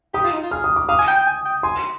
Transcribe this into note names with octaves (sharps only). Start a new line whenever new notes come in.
G4 D#6
F4
D#4
F4
G#4 F6
D#6
D6
F5 D#6
G#5
G5
G5
G#5
G5
G#5 C6